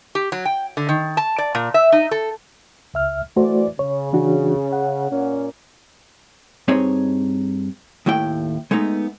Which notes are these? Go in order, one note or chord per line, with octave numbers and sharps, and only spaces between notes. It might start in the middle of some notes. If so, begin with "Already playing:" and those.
G4
F#3
G5
D3
D#3
A5
D5
A#2
E5
D#4
A4
C#2 E5 F6
E3 A3 F#4 C5 D5
C#3 C#5
E3 D4 F#4
F#5
A#2 A#3 C#4
G2 C4 D#4 G#4 C#5 D#5
D#2 A2 A3 E4 G5
G#3 A3 B3 D#4